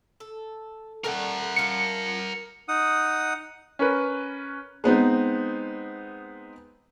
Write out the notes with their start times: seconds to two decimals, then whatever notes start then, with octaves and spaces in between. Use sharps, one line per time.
0.20 A4
1.04 A3 A#4 D5 F#5 G5
1.56 D4 F4 G#4 C#7
2.68 D#4 F#5 D#6
3.79 C#4 A#4 B4
4.84 G#3 B3 C4 D#4